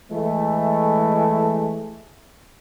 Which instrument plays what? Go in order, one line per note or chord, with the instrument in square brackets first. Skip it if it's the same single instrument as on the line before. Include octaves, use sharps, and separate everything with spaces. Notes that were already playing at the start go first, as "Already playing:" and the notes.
[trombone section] E3 G#3 A3